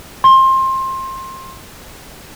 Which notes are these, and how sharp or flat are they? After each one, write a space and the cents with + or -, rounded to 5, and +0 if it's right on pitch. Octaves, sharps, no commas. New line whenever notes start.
C6 +20